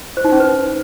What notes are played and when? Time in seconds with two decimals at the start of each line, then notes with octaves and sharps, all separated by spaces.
0.17 C5
0.25 D#4
0.32 C#4
0.40 B4